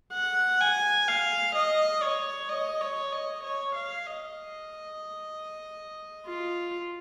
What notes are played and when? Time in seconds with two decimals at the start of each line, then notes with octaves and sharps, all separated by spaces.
0.14 F#5
0.61 G#5
1.08 F5
1.55 D#5
2.02 C#5
2.49 D#5
2.81 C#5
3.12 D#5
3.44 C#5
3.75 F5
4.07 D#5
6.27 F4